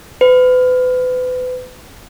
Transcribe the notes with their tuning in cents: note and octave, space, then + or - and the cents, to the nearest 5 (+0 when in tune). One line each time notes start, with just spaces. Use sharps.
B4 +35